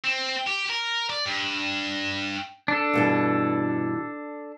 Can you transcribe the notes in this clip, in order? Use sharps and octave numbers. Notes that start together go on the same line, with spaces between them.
C4
G4
A#4
D5
G2
D4 A4
G2 B2 E3